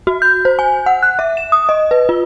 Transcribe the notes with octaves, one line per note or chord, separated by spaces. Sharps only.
F#4
G6
C5
G#5
F#5
F#6
E5
E7
D#6
D#5
B4
F4